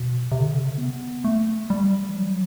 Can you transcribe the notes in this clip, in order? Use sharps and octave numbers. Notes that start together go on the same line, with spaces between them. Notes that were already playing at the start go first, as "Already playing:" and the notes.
Already playing: B2
C3
D3
C3
B3
A3
G3
E3
F#3